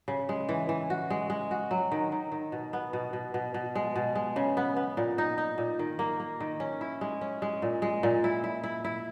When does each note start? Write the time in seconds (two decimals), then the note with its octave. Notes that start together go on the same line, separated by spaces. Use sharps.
0.08 C#3
0.29 G#3
0.49 E3
0.69 E3
0.90 F#4
1.10 G#3
1.30 G#3
1.51 F#4
1.71 F#3
1.92 D#3
2.12 D#3
2.32 D#3
2.52 B2
2.73 B3
2.93 B2
3.13 B2
3.34 B2
3.54 B2
3.75 G#3
3.96 B2
4.15 G#3
4.36 C#3
4.57 B3
4.76 B3
4.97 A#2
5.18 D#4
5.38 D#4
5.58 A#2
5.79 D#3
5.99 A#3
6.20 A#3
6.40 D#3
6.60 C#4
6.81 E4
7.01 G#3
7.21 C#4
7.42 G#3
7.62 A#2
7.82 G#3
8.03 A#2
8.24 E4
8.44 E4
8.64 E4
8.85 E4